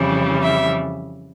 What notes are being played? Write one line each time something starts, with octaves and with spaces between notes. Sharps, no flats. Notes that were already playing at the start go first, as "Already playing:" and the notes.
Already playing: F2 C#3 E3 G3
E5